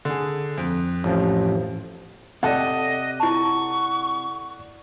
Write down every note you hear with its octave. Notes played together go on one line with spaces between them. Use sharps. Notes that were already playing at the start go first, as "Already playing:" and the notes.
D3 G#4
F2
A1 F3
C3 A4 D5 D#5 F#5
E4 A5 C#6